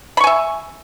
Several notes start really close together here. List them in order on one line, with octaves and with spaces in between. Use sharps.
B5 C#6 G#5 E5